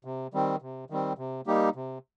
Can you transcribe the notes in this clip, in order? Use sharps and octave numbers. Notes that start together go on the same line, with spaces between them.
C3
D#3 G3 C4
C3
D#3 G3 C4
C3
G3 A#3 D#4 G4
C3